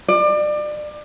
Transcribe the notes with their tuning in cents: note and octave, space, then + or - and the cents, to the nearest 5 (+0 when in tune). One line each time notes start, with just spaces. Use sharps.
D5 +30